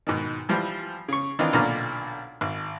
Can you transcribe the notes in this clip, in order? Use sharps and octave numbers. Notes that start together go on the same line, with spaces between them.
G#2 B2 D#3
E3 F3 G3
C#3 C#6
D#3 E3 C4 D4 D#4 F4
B1 A#2 D3 D5 A#5 F6
G#1